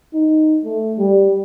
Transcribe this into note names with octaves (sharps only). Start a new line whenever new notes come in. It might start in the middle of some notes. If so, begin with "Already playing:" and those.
D#4
A3
G3